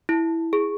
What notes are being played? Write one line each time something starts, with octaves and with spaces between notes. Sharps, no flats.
E4
G#4